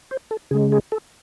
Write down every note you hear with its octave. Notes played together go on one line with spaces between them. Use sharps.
C5
A4
C#3 G#3 G#4
G#4
A4